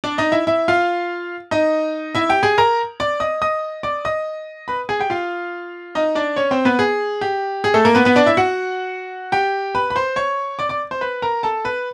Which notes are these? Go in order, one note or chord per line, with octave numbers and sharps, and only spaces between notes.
D4 D5
D#4 D#5
E4 E5
E4 E5
F4 F5
D#4 D#5
E4 E5
G4 G5
G#4 G#5
A#4 A#5
D5 D6
D#5 D#6
D#5 D#6
D5 D6
D#5 D#6
B4 B5
G#4 G#5
G4 G5
F4 F5
D#4 D#5
D4 D5
C#4 C#5
C4 C5
B3 B4
G#4
G4
G#4
A3 A4
A#3 A#4
B3 B4
B3 B4
D4 D5
E4 E5
F#4 F#5
G4 G5
B4 B5
B5
C5 C6
C#5 C#6
D5 D6
D5 D6
C5 C6
B4 B5
A#4 A#5
A4 A5
B4 B5